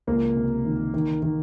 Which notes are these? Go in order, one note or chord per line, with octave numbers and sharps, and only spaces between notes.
C#2 A#3
C3
D#3
D#3
D#3